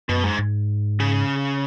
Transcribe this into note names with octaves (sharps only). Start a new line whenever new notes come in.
F#2 B2
G#2
G#2
C#3